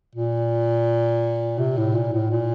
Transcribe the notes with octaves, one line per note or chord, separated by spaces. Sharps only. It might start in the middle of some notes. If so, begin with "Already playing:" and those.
A#2
C3
A2
A#2
A2
A#2